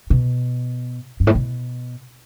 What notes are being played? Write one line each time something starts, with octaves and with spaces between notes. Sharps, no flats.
B2
G2
A2
B2